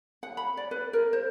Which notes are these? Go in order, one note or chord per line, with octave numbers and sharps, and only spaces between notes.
F#5
B5
D5
B4
A#4
C5